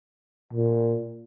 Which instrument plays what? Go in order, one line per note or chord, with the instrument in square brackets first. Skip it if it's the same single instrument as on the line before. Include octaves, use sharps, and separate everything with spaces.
[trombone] A#2